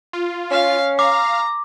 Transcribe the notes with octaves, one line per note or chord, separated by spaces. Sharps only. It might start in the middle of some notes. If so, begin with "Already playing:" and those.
F4
C#4 F5
F5 A#5 D6